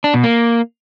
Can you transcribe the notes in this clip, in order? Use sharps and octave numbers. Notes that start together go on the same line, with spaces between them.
D4
B2
A#3